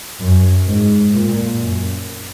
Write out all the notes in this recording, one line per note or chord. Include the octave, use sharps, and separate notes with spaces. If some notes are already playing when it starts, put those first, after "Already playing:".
F#2
G#2
A#2
F#2